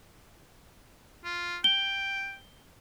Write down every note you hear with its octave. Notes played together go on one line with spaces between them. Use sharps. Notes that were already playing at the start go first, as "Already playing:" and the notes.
F4
G5 G7